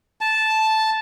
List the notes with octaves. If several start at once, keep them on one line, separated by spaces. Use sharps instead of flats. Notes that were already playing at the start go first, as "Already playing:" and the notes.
A5